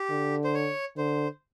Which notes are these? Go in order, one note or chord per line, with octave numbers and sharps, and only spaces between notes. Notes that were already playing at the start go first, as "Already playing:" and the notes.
Already playing: G4
D3
C5
C#5
D3 C5